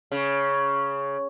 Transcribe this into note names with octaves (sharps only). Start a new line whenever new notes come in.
C#3